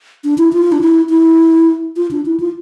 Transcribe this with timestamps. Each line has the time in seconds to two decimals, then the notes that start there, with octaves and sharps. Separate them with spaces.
0.24 D4
0.38 E4
0.53 F4
0.72 D4
0.81 E4
1.10 E4
1.96 F4
2.11 D4
2.26 E4
2.40 F4